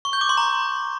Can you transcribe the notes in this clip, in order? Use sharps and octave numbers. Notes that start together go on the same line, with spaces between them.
C#6
G6
D6
C6
A#5